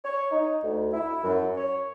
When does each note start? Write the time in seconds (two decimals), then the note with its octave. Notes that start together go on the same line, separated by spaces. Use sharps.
0.05 C#5
0.31 D#4
0.64 D2
0.93 E4
1.24 F#2
1.57 C#5